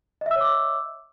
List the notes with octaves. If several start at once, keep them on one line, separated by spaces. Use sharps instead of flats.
C#5 D#5 E5 D6 E6